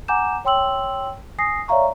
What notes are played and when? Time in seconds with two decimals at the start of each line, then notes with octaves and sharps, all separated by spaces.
0.08 F#5 G#5 A#5 D6 G6 E7
0.45 C#5 G5 C6 E6 F#7
1.38 G#5 D#6 A#6 C7
1.68 C#5 D5 E5 F5 A#5 C#6